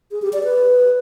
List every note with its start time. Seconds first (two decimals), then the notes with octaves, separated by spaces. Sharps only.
0.11 G#4
0.22 G4
0.33 D5
0.44 B4